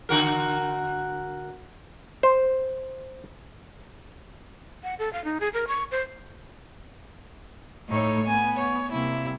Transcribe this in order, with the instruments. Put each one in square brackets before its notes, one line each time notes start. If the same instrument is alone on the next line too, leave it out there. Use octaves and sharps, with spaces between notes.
[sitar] D3 F#4 A#4
[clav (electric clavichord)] C5
[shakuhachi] F#5
A4
F5
D#4
G#4
A#4
C#6
C5
[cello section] A2 A4 C#5 [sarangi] D#4
[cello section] B3 [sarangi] G#5
[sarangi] C#5
[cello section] C3 G3 A#3 [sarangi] E4